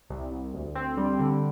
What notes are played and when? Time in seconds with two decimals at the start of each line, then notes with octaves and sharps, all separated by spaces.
0.10 C2
0.31 C2
0.54 D2
0.75 C4
0.97 G3
1.19 D3